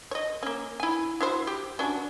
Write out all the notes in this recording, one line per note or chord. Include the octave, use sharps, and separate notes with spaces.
C#5 D#5
A#3 C#4
E4 G#5
E4 F#4 C5
G4
C#4 D4 F#4